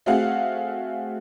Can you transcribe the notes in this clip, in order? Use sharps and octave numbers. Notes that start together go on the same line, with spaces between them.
A3 C4 F#4 G#4 F5 F#5